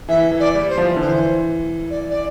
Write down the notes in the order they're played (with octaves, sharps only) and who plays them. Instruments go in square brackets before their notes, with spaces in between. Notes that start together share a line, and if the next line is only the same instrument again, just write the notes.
[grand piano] E3 [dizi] E5
[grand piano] E3
[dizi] D5
[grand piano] G3
[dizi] C5
[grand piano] F3
E3
[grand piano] D3 [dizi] C5
[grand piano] E3
[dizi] D5
D5